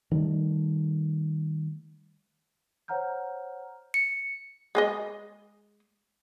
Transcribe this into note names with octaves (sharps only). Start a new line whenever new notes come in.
D#3 G3 A3
C5 C#5 F#5 A#5 F6 G6
C#7
G#3 G#4 D#5